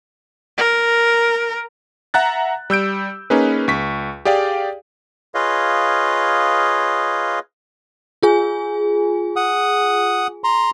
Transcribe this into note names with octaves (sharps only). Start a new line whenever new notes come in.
A#4
E5 F#5 A#5 F#6 A6
G3 E6 G6 D7
A#3 C#4 D#4 G#4 B4
C#2 C#6 B6
G4 G#4 D5 F5 G5
F4 G#4 B4 C#5 D#5 F5
F4 G#4 G#5
F#5 D#6
A#5 C6